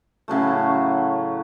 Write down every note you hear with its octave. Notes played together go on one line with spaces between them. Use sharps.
A2 C#3 F#3 A3